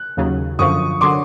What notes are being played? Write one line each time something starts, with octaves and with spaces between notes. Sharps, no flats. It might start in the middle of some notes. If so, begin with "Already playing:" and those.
Already playing: F#6
D#2 C#3 F#3
F#2 D3 F3 C#6 D#6
D3 F#3 C6 D6